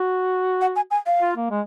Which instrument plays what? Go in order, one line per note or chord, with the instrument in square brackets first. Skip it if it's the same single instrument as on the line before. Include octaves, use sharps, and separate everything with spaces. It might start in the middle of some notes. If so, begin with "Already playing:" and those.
Already playing: [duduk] F#4
[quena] F#5
G#5
G#5
F5
[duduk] F4
A#3
G#3